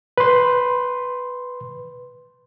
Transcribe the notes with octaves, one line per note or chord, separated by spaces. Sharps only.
B4 C6